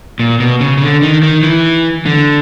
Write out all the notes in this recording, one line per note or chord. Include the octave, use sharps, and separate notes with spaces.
A#2
B2
C#3
C#3
D3
D#3
D#3
E3
D3